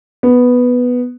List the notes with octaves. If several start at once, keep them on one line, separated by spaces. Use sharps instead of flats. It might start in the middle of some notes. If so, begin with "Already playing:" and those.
B3